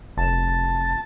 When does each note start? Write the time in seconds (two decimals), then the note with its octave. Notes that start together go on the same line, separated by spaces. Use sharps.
0.17 F1 A5